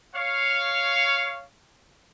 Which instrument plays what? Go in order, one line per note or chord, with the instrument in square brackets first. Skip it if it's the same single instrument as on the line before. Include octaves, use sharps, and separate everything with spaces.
[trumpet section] C#5 F5